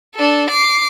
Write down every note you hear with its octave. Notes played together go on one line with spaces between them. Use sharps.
D4 A4
D6 C7